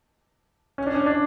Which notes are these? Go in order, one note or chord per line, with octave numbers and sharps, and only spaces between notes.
C#4
D4
C#4
D4